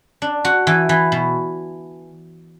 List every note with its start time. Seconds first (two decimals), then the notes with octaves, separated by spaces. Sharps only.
0.22 D4
0.45 F#4
0.67 E3
0.89 E3
1.12 B2